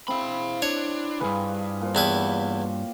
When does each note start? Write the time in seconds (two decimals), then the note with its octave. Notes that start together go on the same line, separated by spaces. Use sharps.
0.08 C4 E4 F5 B5
0.62 D4 C#5
1.20 C#2 G2 F4 G#4 B4
1.81 A#2 C5
1.95 E2 E4 G4 B4 C#5